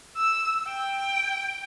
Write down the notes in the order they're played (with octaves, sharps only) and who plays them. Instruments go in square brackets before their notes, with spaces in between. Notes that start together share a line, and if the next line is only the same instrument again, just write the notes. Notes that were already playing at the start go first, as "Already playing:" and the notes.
[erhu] E6
G5